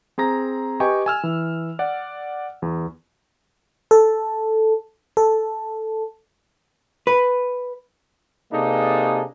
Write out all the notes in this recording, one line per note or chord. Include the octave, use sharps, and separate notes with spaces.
C4 G#4 A#5 A#6
G4 B4 D#5 G5 G#5 C#6
G#5 E6 F6
E3
D5 F#5
E2
A4
A4
B4
C3 A#3 D4 D#4 G#4 A4